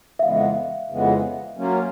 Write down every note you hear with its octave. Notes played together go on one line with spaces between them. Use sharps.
E5
F2 C#3 E3 G#3 B3 F5
F2 C#3 E3 G#3 B3
F#3 A#3 C#4 F4